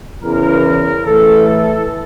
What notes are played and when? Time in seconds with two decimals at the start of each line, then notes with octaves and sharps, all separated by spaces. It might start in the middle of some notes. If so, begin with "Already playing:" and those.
0.23 E2 C#3 E3 A#4
1.06 A2 E3 A4
1.48 A4